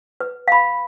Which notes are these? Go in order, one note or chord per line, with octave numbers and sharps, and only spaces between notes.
B4
F5 B5